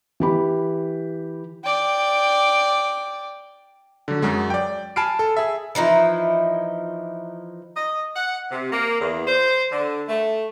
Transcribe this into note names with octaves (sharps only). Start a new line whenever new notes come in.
E3 G4 B5
D5 G5
D3 F#3
F#2 F#3 G#3
D5 G5
G#5 A5 B5 F6 C7 D7
A4
G#4 E5
E3 F3 D#4 E4
D#5
F#5
C3
A#3
E2
C5
D3
A3